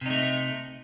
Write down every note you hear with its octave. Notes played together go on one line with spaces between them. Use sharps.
C3 A3 D#4